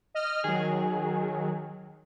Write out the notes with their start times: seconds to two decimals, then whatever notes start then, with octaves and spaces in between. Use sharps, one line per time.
0.14 D#5 F6
0.44 D#3 F#3 G#4